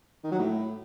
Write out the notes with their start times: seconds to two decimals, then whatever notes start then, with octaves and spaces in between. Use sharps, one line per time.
0.24 D#3
0.32 F#3
0.39 A2